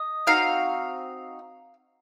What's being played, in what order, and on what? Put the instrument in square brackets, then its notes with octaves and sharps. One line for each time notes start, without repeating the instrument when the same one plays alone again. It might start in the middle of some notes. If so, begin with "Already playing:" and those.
Already playing: [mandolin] D#5
C4 D#4 F#4 F5